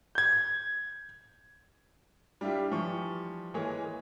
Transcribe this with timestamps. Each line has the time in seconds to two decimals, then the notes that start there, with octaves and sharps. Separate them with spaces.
0.15 G6 G#6
2.41 G3 D4 E4 F4 G4
2.71 E3 F3 G3 C#6
3.54 E3 G#3 A#3 G#4 C#5